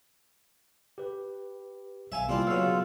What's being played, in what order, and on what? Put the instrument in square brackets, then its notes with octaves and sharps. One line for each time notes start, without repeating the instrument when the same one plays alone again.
[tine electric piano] G4 B4
[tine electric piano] B1 G#5 [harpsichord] E5 F5
[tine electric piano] C3 G3 E4 [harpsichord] A#3 C4 [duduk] F4
[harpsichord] B1 C#3 [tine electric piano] F#4 F5 E6